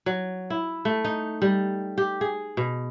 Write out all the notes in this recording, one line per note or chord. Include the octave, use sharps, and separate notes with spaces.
F#3
E4
A3
D#4
G3
G4
G#4
B2